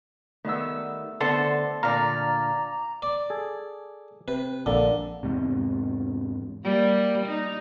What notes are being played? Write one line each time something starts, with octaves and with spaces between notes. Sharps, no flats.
D#3 G3 A3 B3 E6
D3 B3 A4 C5 A5
A#2 D3 D5 F5 A#5
D5
G#4 A4 G#5
C3 B4
A#1 D3 A#3 A4
E2 G#2 C3
G3 A#3
D#4